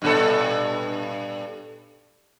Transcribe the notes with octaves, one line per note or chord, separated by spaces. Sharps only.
G2 A#2 A4